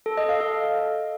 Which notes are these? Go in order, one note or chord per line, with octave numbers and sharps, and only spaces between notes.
A4
D#5
F5
A4